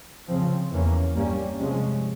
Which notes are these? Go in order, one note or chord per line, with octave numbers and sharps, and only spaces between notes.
C#3 F3 C4
E2 E3 A#3 C#4
G2 G3 A#3 C#4
C3 F3 G#3 C#4